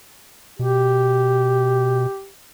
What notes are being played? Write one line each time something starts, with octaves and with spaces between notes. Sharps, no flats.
B2 G4